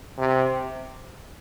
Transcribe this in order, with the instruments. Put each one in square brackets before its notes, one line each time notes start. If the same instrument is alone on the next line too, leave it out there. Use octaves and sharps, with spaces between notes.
[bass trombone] C3